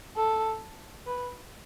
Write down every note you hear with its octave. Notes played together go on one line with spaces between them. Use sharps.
A4
B4